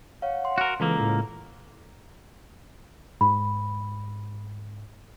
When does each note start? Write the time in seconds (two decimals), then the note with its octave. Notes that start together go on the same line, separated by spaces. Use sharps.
0.22 C#5 F5 F#5
0.45 C6
0.58 F#4 A#4
0.80 C#2 E3 A#3 A4 A#5 E6
1.00 A2
3.21 G#2 B5